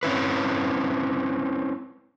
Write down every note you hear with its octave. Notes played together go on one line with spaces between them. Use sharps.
C4 C#4 E4 B4